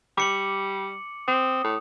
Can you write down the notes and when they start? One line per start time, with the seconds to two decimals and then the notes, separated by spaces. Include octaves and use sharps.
0.18 G3 D6 C#7 F#7
1.28 C4 D#6
1.64 A2